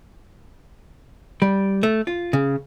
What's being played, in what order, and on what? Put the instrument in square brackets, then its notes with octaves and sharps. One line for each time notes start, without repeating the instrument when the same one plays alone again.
[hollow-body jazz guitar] G3
A3
F4
C#3